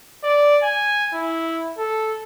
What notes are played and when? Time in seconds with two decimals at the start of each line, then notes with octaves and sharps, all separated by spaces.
0.24 D5
0.63 G#5
1.14 E4
1.78 A4